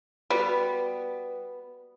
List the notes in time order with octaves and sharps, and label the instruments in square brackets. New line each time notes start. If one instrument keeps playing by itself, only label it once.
[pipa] G3 [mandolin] B3 [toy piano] F#4 B4